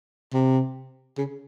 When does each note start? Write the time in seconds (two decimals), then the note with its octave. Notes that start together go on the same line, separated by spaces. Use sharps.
0.33 C3
1.18 C#3